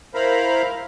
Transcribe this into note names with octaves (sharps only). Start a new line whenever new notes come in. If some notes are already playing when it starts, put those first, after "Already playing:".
E4 A#4 C5 F5 A#5 B5